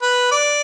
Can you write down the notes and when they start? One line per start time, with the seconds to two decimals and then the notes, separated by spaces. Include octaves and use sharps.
0.02 B4
0.31 D5